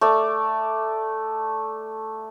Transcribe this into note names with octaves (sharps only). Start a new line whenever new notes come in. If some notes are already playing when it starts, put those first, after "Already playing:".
A3 D5